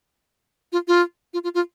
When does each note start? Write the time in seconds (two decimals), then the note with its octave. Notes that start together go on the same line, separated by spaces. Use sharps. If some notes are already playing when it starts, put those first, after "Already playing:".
0.72 F4
0.88 F4
1.34 F4
1.44 F4
1.54 F4